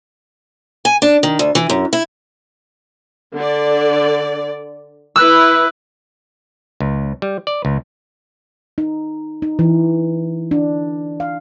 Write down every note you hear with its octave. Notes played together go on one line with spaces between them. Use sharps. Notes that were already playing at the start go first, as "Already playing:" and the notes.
G#5
D4
D#3
D2
E3
F#2
E4
D3 D5
E4 B4 E6 F#6
C#2
G3
D5
C#2
D#4
D#4
E3
D4
F5